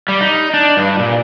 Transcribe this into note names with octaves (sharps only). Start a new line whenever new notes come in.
G3
D#4
D4
G2
A#2